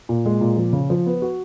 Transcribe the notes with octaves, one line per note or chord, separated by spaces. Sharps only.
A#2
G#3
A#2
F3
C#3
F3
B3
F#4